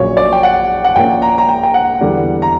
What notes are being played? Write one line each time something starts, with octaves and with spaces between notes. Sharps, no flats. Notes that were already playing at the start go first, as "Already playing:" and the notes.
Already playing: A#1 A#2 F#3 C#4 C#5
D5
G5
F#5
F#5
A#1 A#2 A#3 C#4 G5
A#5
A#5
G5
G5
F#5
E2 D3 G3 B3 D4
A#5